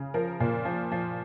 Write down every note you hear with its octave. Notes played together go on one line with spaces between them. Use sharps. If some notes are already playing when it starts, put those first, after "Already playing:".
Already playing: C#3
F3 A#4
A#2
F3
F3